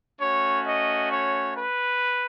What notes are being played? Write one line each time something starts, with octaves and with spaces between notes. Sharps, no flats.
A3 C#4 F#4 C#5
D#5
C#5
B4